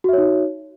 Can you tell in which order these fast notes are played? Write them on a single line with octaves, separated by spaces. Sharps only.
F#4 E5 C#5 D#4